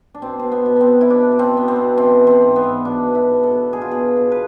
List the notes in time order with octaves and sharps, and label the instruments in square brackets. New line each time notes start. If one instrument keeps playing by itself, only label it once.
[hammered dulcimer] D4
B2 C4
B2 C4
B3
B2
B3 C4
B2
E4
B2 D4
B2
C4
B2 B3
C4
B2
E3 C4
E3
C4
G#2
B3
G#2
B2 D4
B2
E4
B2
A4
B2
B2 G#4
F4
B2 G#4
B2
B4